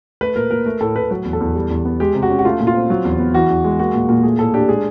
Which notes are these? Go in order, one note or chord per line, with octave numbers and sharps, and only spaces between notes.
A3 B4
A#2 A#4
A#2 A#4
A3 A#4
A2 A4
A2 B4
F#3 B4
E2
A4
E2
G3
E2
B3
G#3 G4
C3
F#4
C#4
F#4
A3 F4
A#2
F4
C4
F#3
E2
B3
E3 F#4
E2
G#3
A#3 F#4
A#2
A#2
A3 G#4
A2 A4
D4 G4
G#3 G#4